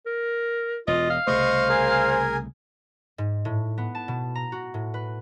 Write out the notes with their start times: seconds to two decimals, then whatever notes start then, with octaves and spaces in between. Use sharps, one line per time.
0.06 A#4
0.88 E1 F4 D#5
1.10 F5
1.27 C2 C#3 A3 C5 D#5 C#6 D#6
1.69 G#4 A#4 G#5
3.18 G#2
3.45 A2
3.78 B3
3.95 A5
4.08 B2
4.35 A#5
4.52 F#4
4.74 A2
4.94 B4